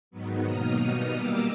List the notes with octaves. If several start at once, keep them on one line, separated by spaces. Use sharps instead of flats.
G#2 D#3 F#3 B3
B2 F#3 A#3 D#4 D#6 F6
B2 G3 B3 D#4 D#6 F6
A#2 G3 A#3 D6 E6